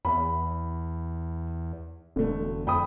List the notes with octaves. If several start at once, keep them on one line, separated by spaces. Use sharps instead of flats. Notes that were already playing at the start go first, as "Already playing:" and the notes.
E2 B5
E1 D3 A3
F2 G5 B5 D#6